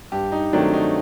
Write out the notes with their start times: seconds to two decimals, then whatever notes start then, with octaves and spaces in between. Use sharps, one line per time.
0.12 G2 G4
0.32 D#4
0.53 D#3 F#3 A3 C4 D4
0.73 D#4